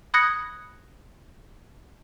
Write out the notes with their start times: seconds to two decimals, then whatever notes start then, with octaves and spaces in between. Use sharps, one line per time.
0.14 B5 D#6 F#6 G#6 A#6 C#7